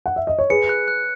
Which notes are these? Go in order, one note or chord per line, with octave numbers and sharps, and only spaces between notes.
F#5
E5
D#5
C#5
G#4 B4 C#7
F#6
F#6